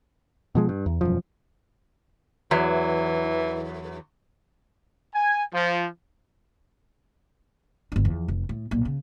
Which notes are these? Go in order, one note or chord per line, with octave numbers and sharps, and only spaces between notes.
B2 F3 G#3
G2
E2
E1 F#2 F3
E2 E3 F#3
G#5
F3
G1 D4
E2 F3
F1
A2
B1 A#2
C#3